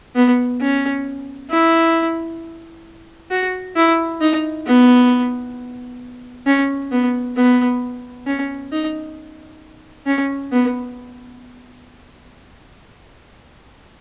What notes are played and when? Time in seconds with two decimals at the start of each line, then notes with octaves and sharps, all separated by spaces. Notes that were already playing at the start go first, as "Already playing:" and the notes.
0.15 B3
0.61 C#4
1.50 E4
3.31 F#4
3.76 E4
4.21 D#4
4.67 B3
6.47 C#4
6.91 B3
7.36 B3
8.27 C#4
8.72 D#4
10.07 C#4
10.52 B3